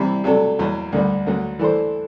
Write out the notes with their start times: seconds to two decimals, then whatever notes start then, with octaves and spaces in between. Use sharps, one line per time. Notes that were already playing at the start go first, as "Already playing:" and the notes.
Already playing: C3 E3 G3 C4 E4
0.24 C3 F#3 A3 D4 A4
0.59 E2 B2 F#3
0.92 D2 D3 G3
1.26 D2 D3 F#3
1.59 E3 A3 D4 A4 C5